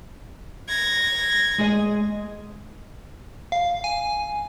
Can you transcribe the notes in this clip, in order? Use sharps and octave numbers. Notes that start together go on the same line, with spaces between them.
G#6 A#6
G#3 G#4 D#5
F5
G#5